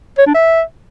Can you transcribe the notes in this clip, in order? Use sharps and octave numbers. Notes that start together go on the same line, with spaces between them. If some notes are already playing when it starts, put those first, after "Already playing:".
C#5
D4
E5